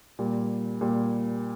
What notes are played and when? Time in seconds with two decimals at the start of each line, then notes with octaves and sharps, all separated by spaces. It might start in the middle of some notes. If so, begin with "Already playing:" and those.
0.19 A#2 G3
0.81 A#2 G3